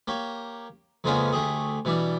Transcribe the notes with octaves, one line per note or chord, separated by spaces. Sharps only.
A#3 G4 C#5
F2 C#3 G#3 A#3 B3 C#4
D2 A3 G4 G#4
B2 E3 G3 D4